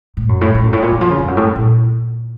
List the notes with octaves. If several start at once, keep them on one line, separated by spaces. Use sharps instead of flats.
A2
F#2
A2
A2
F#2
A2
A#2
D#3
F3
C#3
F2
F#2
A2
A#2